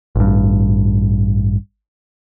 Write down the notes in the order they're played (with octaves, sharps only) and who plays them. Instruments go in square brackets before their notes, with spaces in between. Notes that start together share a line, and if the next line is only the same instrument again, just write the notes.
[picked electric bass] A1 G2